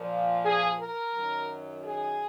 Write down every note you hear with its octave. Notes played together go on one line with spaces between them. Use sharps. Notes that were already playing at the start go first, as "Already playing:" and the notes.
Already playing: A#2 F3
G#4
A#4
F#2 D#3 F#3
G#4